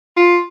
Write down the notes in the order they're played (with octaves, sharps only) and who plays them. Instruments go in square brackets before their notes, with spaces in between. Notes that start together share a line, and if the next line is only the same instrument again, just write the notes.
[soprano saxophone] F4